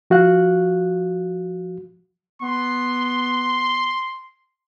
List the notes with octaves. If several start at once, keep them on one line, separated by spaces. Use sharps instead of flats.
F3 F#4 F5 F#6
B3 C6